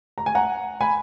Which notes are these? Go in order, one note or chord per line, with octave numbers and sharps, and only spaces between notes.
A#5
G#5
F#5 A#5
G#5 B5